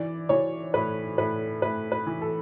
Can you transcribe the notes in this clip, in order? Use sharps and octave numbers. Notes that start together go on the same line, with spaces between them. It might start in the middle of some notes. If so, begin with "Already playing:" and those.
Already playing: E3 D5
E3 C#5
A2 B4
A2 B4
A2 B4
B4
E3
A4